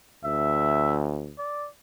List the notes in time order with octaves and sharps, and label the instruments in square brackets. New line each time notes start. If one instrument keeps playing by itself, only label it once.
[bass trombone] D2 [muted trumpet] E5
[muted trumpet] D5